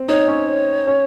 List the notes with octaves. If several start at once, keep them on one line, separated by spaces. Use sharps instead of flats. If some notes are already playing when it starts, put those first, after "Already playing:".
Already playing: C4
D#4 C#5
C#4
C#4